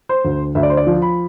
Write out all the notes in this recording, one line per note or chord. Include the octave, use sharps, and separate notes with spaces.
C5
D2
D2 E5
D5
C5
D5
F3
B5